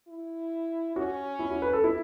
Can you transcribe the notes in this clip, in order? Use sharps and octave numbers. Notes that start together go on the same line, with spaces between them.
E4
C#4 F#4
E4
F#4
B4
A4
E4